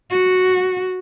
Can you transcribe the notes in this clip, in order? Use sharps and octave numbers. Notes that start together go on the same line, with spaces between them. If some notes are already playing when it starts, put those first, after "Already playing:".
F#4